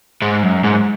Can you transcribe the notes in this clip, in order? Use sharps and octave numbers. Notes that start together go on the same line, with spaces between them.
G#2
F#2
G#2